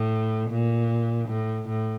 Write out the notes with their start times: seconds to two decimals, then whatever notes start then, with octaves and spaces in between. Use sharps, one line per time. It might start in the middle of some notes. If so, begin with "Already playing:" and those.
Already playing: A2
0.50 A#2
1.28 A2
1.68 A2